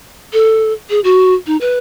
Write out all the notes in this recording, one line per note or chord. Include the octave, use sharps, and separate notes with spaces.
A4
G#4
F#4
D#4
B4